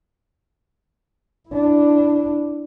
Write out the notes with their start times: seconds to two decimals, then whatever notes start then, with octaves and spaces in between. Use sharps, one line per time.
1.49 D4 E4